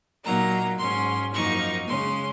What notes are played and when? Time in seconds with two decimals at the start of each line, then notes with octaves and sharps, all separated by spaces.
0.24 A#2 F#3 A#3 D#4 A#5
0.78 G#2 F#3 C#4 C6
1.32 F#2 F3 A#3 D#4 C#6
1.86 C#3 G#3 C#4 C6